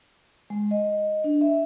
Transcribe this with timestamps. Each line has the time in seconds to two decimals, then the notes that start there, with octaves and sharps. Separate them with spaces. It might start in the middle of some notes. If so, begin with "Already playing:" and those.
0.50 G#3
0.71 D#5
1.24 D4
1.41 E5